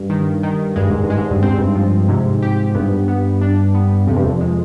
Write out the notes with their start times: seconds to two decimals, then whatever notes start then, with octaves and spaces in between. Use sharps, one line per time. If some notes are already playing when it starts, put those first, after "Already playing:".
Already playing: G2
0.10 D#3
0.43 D#3
0.76 G2 G#3
0.91 G#2
1.04 G2
1.10 G#3
1.17 G#2
1.31 G2
1.43 G#2 C4
1.58 G2
1.75 F3
2.09 G#2 C3
2.42 G4
2.75 G2 B3
3.08 B3
3.41 D4
3.75 B3
4.07 F2 C3
4.16 G2
4.24 F2
4.41 G#3